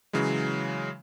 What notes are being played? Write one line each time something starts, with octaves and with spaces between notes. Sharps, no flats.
C#3 E3 F#3 G#3